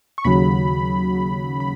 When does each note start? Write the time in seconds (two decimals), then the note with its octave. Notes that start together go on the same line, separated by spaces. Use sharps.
0.18 C#6
0.25 D#2 C#3 F#3 B5
1.60 B5